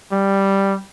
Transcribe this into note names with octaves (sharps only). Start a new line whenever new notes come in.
G3